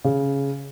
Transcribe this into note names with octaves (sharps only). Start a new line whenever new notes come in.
C#3